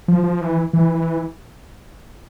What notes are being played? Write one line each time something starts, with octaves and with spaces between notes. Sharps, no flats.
F3
F3
E3
E3
E3